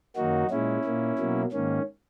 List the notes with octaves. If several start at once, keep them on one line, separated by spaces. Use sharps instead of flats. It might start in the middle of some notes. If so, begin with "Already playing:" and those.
F#2 D#3 F#3 A#3 D#4 F#4
A#2 G#3 C#4 E4
A#2 A#3
B2 F#3 A#3
G#2 D#3 A#3 C#4